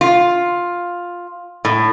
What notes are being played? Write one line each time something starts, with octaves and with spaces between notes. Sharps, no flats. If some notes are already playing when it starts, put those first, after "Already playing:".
F4
A2